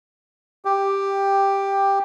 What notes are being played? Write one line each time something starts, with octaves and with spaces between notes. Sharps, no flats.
G4